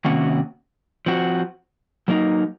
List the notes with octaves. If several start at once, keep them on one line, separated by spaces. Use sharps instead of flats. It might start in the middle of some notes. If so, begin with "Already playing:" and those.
C3 D#3 A#3 C#4 F#4
F3 C4 F#4
F#3 A#3 D#4